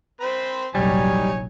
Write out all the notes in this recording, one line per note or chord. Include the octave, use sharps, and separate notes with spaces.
C4 C5 B5
F1 A#1 F#3 G3 D#4 C#5 G#5